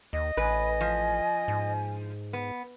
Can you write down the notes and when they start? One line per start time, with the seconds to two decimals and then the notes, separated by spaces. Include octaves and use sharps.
0.13 D#2 D#5
0.37 A1 B4 G#5
0.81 F3
1.48 G#2
2.33 B3